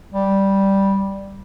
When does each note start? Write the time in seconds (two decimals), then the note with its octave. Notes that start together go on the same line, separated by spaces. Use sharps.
0.12 G3